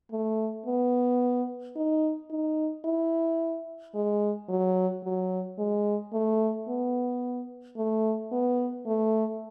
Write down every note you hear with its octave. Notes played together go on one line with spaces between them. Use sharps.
A3
B3
D#4
D#4
E4
G#3
F#3
F#3
G#3
A3
B3
A3
B3
A3